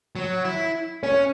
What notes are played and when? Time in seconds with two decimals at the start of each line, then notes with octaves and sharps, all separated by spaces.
0.16 F#3
0.45 E4
1.03 C#4 C#5